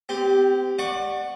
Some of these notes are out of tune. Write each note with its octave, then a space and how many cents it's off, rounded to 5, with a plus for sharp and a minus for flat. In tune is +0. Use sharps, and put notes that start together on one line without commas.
C4 -35 G4 +0
D5 +25 F#5 +0 C#6 +0